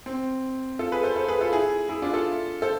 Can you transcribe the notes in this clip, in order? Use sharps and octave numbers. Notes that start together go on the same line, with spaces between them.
C4
F4 A4
G#4 B4
A4 C5
A4 C5
G#4 B4
F4 A4
E4 G#4
E4 G#4
D4 F4
F4 A4
A4 C5